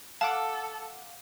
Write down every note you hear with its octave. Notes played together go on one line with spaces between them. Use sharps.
A4 F5 F#5 A5 D6